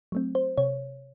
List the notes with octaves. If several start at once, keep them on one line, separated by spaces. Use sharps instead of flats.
F#3 A3 C4
C5
C3 C#5